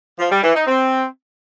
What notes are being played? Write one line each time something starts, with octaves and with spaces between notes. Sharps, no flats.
F3
G3
E3
D#4
C4